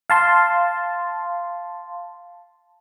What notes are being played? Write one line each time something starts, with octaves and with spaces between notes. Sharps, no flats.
F5 A5 C6